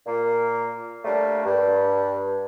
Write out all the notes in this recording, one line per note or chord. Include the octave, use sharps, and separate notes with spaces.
A#2 A#3
G3 A3 A#3 D4
G2